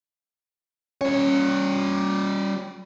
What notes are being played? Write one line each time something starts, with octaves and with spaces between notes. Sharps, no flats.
G3 C#4 C#5